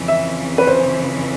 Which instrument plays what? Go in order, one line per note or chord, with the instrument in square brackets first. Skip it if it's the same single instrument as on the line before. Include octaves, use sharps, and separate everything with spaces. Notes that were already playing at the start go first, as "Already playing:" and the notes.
Already playing: [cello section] F2 C#3 E3
[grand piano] E5
B4
C5